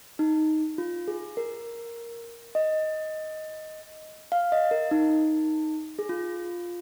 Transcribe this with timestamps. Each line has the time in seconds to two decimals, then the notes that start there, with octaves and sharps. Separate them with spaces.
0.19 D#4
0.78 F4
1.08 G#4
1.37 A#4
2.55 D#5
4.32 F5
4.52 D#5
4.71 A#4
4.91 D#4
5.99 G#4
6.09 F4